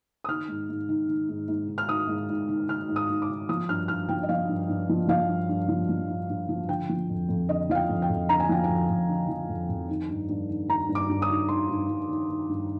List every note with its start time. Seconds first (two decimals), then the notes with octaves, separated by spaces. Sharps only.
0.24 D#6
0.28 D#3 F6
0.48 G#2
0.69 G#2
0.89 D#3
1.09 D#3
1.29 G#2
1.48 G#2
1.68 D#3
1.78 F6
1.89 D#3 D#6
2.08 G#2
2.29 G#2
2.49 D#3
2.69 D#3 F6
2.89 G#2
2.96 D#6
3.09 G#2
3.22 D6
3.29 D#3
3.49 F3 D#6
3.69 G2 F6
3.88 G2 F6
4.09 F3 G5
4.23 D#5
4.29 F3 F5
4.49 G2
4.69 G2
4.89 F3
5.08 F3 F5
5.29 G2
5.49 G2
5.69 F3
5.89 F3
6.09 G2
6.29 G2
6.49 F3
6.69 D3 G5
6.89 F3
7.10 F2
7.29 F2
7.49 D3 D#5
7.69 F3 F5
7.75 G5
7.89 F2
8.02 G5
8.09 F2
8.29 D3 A#5
8.40 G#5
8.49 F3 G5
8.64 F2 G#5
8.89 F2
9.09 D3
9.29 F3
9.49 F2
9.69 F2
9.89 D#3
10.09 G2
10.29 G2
10.49 D#3
10.69 D#3 A#5
10.89 G2
10.95 D6
11.09 G2
11.22 D#6
11.29 D#3
11.49 D#3 C6
11.69 G2
11.89 G2
12.09 D#3
12.29 D#3
12.49 G2